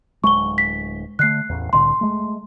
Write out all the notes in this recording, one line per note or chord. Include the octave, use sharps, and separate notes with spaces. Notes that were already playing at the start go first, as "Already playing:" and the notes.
D1 G#3 C#6 G7
B6
D3 A3 F#6 C7
A1 E2
C2 A2 D3 C6
G#3 A3